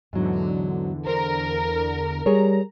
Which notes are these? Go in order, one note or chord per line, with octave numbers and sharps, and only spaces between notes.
E2 G#2 D3 F#3
A#4 C5
G3 G#4 A#4 C#5 A#5